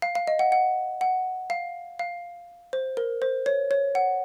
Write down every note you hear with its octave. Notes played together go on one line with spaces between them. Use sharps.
F5
F5
D#5
F#5
F#5
F#5
F5
F5
C5
A#4
C5
C#5
C#5
F#5